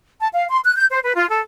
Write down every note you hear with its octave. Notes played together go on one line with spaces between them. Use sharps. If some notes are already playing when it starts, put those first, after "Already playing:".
A5
F5
C6
F#6
G6
C5
B4
F4
A4